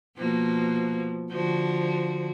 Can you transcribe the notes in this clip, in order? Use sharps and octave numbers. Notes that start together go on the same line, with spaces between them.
B2 F3 A#3
D3 F3 F#4